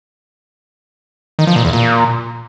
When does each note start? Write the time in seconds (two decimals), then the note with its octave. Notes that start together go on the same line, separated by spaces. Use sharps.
1.39 D#3
1.47 F3
1.56 A#2
1.65 E2
1.73 A#2